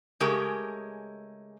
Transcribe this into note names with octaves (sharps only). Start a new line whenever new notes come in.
C#3 G#3 A3 G4 G#4 A#4